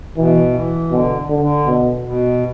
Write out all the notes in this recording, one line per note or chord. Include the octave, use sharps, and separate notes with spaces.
B2 E3
E3
B2 D3
D3
D3
B2
B2